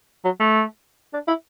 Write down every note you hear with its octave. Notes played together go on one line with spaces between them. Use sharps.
F#3
A3
D4
E4